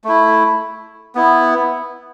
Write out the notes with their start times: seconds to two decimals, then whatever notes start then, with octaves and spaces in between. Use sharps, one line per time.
0.04 A3 E4
1.15 B3 E4